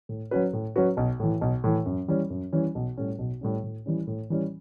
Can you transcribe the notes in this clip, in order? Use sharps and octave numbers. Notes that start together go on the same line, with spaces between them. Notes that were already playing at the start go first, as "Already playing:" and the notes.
A2
F#3 C#4 F#4 B4
A2
F#3 C#4 F#4 B4
B1
A2 E3
B1
A2 E3
F#2
E3 G3 C#4
F#2
E3 G3 C#4
B1
A2 G3 C#4
B1
A2 G3 C#4
A2
E3 G3 C#4
A2
E3 G3 C#4